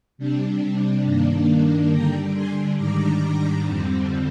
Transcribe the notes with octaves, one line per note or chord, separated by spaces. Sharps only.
C3 G3 D4
G2 D#3 A#3 D4
D3 G3 D4 G5 A#5
G#5 C6
G#2 D#3 G3 D4 A#5 D6
F2 D3 G3 C4